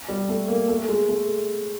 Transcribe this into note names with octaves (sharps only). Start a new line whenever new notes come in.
G3
A3
A#3
A3
G#3
A3